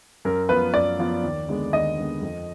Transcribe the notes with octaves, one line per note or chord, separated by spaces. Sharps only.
F#2 A#4
F3 B3 F4 B4
F#2 D5
F3 B3 F4
D#2
D3 G#3 B3
D#2 D#5
D3 G#3 B3
F2